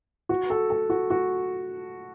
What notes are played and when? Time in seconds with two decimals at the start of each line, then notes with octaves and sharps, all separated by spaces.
0.29 F#4
0.50 A4
0.70 A4
0.90 F#4
1.10 F#4